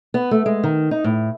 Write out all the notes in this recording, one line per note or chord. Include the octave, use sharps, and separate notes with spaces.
B3
A3
G#3
D#3
D#4
A2